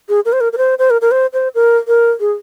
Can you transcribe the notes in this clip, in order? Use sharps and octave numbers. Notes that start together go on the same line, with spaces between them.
G#4
A#4
C5
A#4
A#4
C5
C5
A#4
A#4
C5
C5
A#4
A#4
G#4